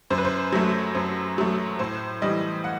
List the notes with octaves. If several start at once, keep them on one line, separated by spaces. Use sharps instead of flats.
F#2 C5
B4
C5
F#3 A3
F#2 C5
F#3 A3
A2 C5
E3 G3 D#5
F#5